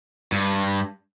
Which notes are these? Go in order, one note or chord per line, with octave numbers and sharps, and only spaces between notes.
G2